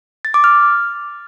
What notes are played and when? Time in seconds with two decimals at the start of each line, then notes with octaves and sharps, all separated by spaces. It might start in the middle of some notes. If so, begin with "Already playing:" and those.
0.25 A6
0.34 D6
0.44 F6